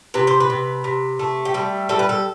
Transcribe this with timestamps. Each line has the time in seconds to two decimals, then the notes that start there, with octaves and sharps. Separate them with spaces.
0.14 C3 B4
0.27 C5
0.40 B4
0.50 C3
0.84 C3
1.19 A3
1.45 G4
1.54 G3 A4
1.89 G3 A4
1.99 B4
2.09 A4